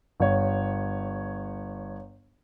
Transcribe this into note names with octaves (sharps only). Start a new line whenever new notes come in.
G1 C#5